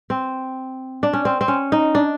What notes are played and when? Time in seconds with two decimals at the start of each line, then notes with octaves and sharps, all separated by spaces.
0.10 C4
1.03 D4
1.13 C#4
1.25 C4
1.41 C4
1.48 C#4
1.72 D#4
1.95 D4